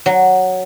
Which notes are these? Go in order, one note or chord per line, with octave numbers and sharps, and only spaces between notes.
F#3